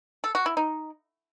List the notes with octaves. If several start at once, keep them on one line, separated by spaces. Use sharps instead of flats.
A4
F#4
E4
D#4